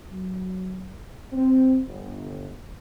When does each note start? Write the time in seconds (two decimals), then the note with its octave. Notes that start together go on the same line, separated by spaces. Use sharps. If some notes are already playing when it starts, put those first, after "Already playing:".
0.11 F#3
1.33 C4
1.87 G1